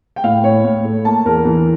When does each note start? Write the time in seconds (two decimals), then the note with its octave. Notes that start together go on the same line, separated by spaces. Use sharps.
0.16 G5
0.24 A2 F5
0.44 A2 C#5
0.64 A2
0.85 A3
1.05 A#3 A5
1.25 E2 A#4
1.45 E3